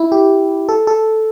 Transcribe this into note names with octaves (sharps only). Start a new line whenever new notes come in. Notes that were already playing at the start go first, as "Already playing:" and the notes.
Already playing: E4
G4
A4
A4